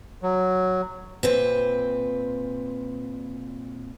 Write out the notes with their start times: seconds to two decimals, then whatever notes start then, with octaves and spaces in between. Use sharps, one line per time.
0.23 F#3
1.23 A#2 C4 B4